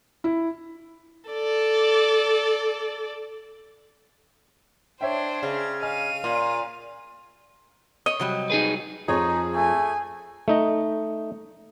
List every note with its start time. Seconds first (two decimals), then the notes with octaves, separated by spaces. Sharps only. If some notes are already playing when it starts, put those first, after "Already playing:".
0.24 E4
1.30 A4 D5
5.01 D4 C5 C#5 E5 G5
5.43 C#3
5.82 D#5 F5 G#5 F6 D#7
6.24 A#2
8.06 C#5 D#5
8.20 C3 F#3 G3
8.50 D#4 G#4 B4
9.08 F2 D#4 G#4 C#5
9.55 A3 G#5
10.48 A3 D#4 D#5